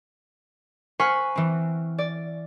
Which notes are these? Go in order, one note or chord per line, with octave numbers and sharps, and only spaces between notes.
C5 F#5 G#5 B5 C#6 F6
E3 C4
D5